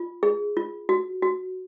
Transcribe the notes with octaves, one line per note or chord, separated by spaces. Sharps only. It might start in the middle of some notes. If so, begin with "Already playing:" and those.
Already playing: F4
G#4
F4
F#4
F#4